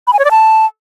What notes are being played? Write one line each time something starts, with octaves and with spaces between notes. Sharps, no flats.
B5
G#5
C#5
D5
A5